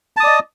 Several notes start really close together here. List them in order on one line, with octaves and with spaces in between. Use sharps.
A5 D#6 D5 D#5